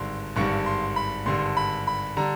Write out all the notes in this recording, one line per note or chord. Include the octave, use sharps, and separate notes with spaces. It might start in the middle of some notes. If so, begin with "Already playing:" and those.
Already playing: G#1 G2 D3 G3 C6
G#1 G2 D3 G3 C#6
C6
B5
G#1 G2 D3 G3 C6
B5
B5
D3 G3 A#5